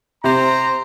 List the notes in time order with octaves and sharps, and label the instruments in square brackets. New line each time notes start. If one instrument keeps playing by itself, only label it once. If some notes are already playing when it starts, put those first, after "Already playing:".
[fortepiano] C3 [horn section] C4 C5 A#5